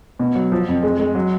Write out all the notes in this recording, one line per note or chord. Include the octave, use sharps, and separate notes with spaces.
B2
F#3
F3
F2
G#3
G#3
F#3